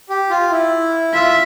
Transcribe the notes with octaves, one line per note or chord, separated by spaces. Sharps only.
G4
F4
E4
F4 E5